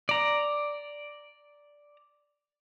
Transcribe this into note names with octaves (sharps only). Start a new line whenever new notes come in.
D5 A#5